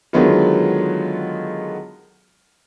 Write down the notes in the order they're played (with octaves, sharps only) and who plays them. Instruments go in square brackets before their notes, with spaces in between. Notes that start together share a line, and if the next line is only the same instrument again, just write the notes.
[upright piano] D3 D#3 F#3 G#3 B3 F4